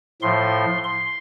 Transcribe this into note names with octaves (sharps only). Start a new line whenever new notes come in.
A2 F3 C6
C6